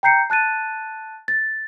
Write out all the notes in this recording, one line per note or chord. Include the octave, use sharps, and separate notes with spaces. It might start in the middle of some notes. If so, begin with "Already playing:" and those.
G5 A#5 G6 C7 C#7
A5 F#6 A6 D#7
A6